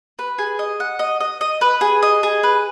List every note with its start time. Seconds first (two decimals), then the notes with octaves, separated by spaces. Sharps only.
0.19 B4
0.39 G#4
0.59 D#5
0.80 F#5
0.99 D#5
1.21 D#5
1.41 D#5
1.61 B4
1.81 G#4
2.03 D#5
2.23 G#4
2.43 B4